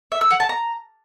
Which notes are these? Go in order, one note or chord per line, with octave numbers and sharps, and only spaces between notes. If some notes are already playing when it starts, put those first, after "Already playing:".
E5
E6
F#5
A5
A#5